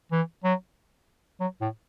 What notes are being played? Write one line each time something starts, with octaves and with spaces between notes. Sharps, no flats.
E3
F#3
F#3
A2